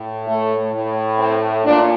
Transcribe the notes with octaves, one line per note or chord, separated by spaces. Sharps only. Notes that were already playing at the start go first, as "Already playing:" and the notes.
Already playing: A2
A3
A2
C4
A#2 D4